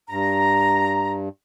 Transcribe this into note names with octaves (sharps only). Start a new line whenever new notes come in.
G2 A#5